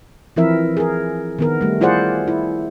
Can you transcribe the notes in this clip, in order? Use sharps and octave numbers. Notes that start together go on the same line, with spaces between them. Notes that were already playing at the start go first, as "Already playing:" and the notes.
E3 F3 C4 E4 A#4 E5
G#4 A#4
D#3 B3 A#4
G3 A3
E4 F4 G#4 C5 D5 F#5
E4